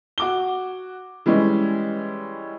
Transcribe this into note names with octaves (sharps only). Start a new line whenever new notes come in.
F#4 D6 G7
E3 G3 G#3 C#4